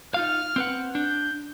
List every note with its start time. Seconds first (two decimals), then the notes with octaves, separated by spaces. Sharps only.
0.14 D#4 F4 F5 F6
0.56 C4 B4 F#5
0.95 D4 G6